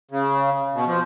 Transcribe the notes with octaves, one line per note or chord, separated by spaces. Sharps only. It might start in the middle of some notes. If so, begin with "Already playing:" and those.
C#3
B2
F3